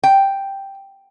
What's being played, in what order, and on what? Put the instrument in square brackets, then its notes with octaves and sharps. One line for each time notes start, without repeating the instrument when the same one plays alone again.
[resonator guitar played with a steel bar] G5